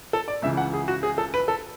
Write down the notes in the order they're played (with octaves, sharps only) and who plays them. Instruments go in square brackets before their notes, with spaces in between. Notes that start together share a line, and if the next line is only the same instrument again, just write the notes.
[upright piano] A4
D5
C#2 C#3 E3 E5
F#5
G#4
F#4
G#4
A4
B4
A4